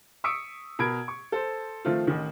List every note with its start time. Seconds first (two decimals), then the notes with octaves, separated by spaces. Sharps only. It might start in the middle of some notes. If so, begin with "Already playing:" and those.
0.24 C#6 D#6 E6 B6 C#7 D7
0.79 B2 A#4 B5 G#6 D7
1.08 C#6
1.32 A4 C5
1.85 D#3 F3 A3 C4 F4
2.07 A1 D#3